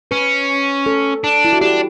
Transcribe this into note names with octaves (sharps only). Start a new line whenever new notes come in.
C#4 B4
A4
D4
E4
F#4
D4 G4